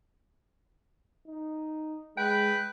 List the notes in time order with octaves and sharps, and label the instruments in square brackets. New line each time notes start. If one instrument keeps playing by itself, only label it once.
[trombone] D#4
[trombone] G#3 [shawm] B4 [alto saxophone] G5